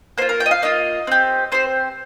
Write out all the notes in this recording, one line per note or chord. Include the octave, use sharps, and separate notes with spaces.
A#3 F4 C5
A#4
G5
D#5
F5
A#3 F4 D#5
C4 G4
C4 G4 C5